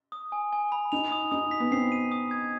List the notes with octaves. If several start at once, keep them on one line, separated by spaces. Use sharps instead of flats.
D#6
G#5
G#5
B5
D#4 F7
D#6
D#4 D#6
B6
B3
C4 C7
D#7
D#6
G#6